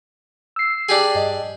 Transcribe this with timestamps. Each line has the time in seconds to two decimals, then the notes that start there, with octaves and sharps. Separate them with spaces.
0.56 E6 C7
0.89 D4 G4 G#4
1.15 G2 D#5